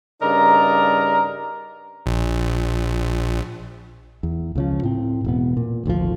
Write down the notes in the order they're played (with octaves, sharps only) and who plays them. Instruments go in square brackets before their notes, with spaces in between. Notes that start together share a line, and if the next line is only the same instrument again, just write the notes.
[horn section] G2 C#3 D#4 A#4 D5 A#5
[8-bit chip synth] A#1
[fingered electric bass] E2
C#2 C#3 F3
A2 C4
E1 B3
A#2
G#1 D2 D#3 F3